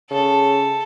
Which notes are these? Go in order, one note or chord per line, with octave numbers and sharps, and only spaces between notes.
C#3 A4